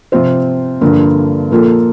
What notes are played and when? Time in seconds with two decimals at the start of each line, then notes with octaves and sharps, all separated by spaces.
0.12 C3 F3 C4 F4 C5
0.81 G2 D3 F3 A#3 F4
1.51 A#2 F3 A#3 F4 A4